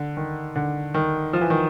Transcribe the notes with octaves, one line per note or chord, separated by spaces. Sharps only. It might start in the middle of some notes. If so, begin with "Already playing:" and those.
Already playing: D3
D#3
D3
D#3
F3
E3
D#3